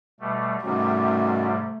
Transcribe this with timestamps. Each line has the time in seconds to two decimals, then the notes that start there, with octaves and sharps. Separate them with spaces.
0.20 B2 G3 A3
0.64 G#2 C3 D#3 G3 A3 C#4 F#4